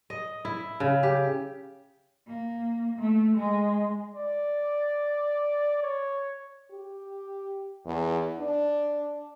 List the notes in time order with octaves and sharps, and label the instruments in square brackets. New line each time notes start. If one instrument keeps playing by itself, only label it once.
[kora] D#5
E4
C#3
G4
[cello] A#3
A3
G#3
[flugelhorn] D5
C#5
[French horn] G4
E2
D4